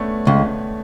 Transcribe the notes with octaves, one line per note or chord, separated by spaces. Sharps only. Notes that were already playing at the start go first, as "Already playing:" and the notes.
Already playing: A3 B3 C#4 D4
C#2